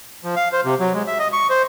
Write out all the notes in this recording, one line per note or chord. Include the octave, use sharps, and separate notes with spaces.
F3
F5
C5
C3
F#3
G#3
E5
D#5
C#6
C5